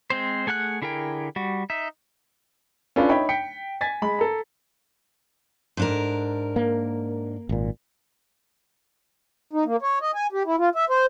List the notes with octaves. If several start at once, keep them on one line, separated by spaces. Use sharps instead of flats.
G#3 C4 C5
A3 G#4 F#5 G#5 F#6
D3 E4 G#4 A#4 G5
G3 F#4
D#4 E5
C#4 D4 F4 A4 B4 D5
D#4 C#5 E5 G5 B5
G5 B6 C#7
G#5 G#6 A6 B6
G#3 B5
A4 A#5
G#2 D4 A#4
A#3
G#1 A#2
D#4
A#3
C#5
D#5
G#5
G4
E4
F4
E5
C5